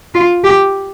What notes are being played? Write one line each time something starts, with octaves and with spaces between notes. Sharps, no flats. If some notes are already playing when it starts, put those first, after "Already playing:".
F4
G4